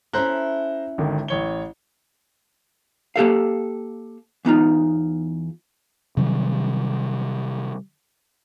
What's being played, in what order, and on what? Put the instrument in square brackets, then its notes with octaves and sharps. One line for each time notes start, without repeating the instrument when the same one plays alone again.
[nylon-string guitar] C#4 E4 A4 [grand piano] C5 A#5 F#6
[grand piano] G#1 D3 D#3
A1 C#5 G7
[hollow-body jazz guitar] A#3 G4 A4 F5
E2 B3 D#4 F4
[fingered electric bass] C3 D#3 F#3 G3